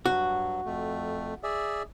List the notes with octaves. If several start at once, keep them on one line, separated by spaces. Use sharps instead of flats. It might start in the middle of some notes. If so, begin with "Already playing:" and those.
G2 F#3 F#4
F2 A3
G#4 D5 E5